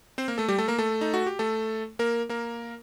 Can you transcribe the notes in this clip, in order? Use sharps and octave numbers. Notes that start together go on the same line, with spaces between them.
C4 C5
A#3 A#4
A3 A4
G3 G4
A3 A4
A#3 A#4
A3 A4
D#4
F#4
G4
A3 A4
A#3 A#4
A#3 A#4